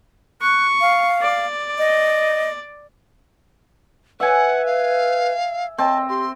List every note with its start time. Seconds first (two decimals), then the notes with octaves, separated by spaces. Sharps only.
0.42 C#6 F#6
0.81 F5
1.21 D5
1.78 D#5
4.20 B4 E5 F#5 G#5
4.66 F5
5.78 C4 D#5 A5
6.09 G4 C6